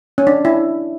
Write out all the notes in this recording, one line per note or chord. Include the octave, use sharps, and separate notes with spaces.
C#4
D4
E4